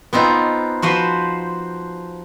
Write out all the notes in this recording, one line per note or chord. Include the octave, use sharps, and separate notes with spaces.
B3 C4 D#4 F4
F3 F#4 B4 C5